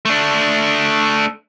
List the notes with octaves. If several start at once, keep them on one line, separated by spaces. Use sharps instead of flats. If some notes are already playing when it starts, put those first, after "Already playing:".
A3 D4